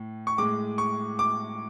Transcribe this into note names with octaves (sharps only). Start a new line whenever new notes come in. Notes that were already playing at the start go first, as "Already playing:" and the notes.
Already playing: A2
C#6
A2 G#3 D6
C#6
D6